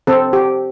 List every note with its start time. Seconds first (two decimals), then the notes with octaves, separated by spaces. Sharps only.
0.07 C4 A4
0.33 G4